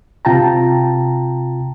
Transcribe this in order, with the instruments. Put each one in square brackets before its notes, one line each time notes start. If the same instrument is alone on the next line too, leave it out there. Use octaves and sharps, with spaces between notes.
[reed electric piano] C3 F4 G5 A5 A#5